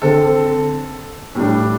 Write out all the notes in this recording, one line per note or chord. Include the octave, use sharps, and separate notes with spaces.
D3 C4 A4
A2 G3 D4